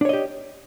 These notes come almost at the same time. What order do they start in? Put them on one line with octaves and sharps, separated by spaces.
D4 C#5 D#5 G4